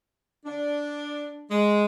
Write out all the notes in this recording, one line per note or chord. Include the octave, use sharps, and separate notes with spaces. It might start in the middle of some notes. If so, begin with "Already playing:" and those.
D4
G#3